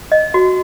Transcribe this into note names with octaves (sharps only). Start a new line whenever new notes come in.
D#5
F#4